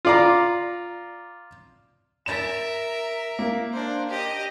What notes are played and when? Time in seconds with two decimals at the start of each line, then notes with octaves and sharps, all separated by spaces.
0.05 F4 D5 A#5
2.26 A#4 E5 A6 E7
3.39 A#3
3.73 D4 C5
4.09 G4 D#5